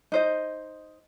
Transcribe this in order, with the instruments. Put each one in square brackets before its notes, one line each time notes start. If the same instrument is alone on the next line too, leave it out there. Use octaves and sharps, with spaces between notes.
[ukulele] D#4 C5 D#5